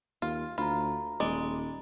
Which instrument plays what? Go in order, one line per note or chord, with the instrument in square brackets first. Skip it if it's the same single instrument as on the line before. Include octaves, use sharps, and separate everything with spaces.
[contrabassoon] D#2 [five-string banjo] F4
[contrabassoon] D2 [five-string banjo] F4 [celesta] A#5 B5
[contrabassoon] D#1 [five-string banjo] G#3 D5